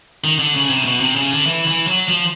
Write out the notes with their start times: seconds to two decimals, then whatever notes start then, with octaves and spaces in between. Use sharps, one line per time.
0.24 D#3
0.39 D3
0.54 C#3
0.70 C3
0.85 B2
1.00 C3
1.16 C#3
1.32 D3
1.47 E3
1.67 E3
1.87 F#3
2.09 F3